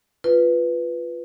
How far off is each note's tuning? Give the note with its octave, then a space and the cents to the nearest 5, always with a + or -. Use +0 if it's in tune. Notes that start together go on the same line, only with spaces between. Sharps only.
F4 +0 B4 +0